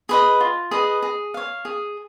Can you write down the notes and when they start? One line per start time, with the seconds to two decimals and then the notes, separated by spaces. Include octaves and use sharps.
0.09 G#4 B4 D#5
0.41 F4
0.71 G#4 B4 D#5
1.02 G#4
1.34 C#5 F5
1.65 G#4